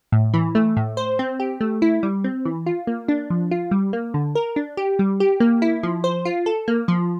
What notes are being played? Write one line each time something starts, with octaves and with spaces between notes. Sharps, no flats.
A2
E3
A3
A2
C5
C4
G4
A3
E4
G3
C4
E3
F4
A#3
D4
F3
F4
G3
A#3
D3
A#4
D4
G4
G3
G4
A#3
E4
F3
C5
F4
A4
A#3
F3